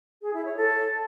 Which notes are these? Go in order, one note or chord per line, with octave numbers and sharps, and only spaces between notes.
G#4
E4
C#5
A4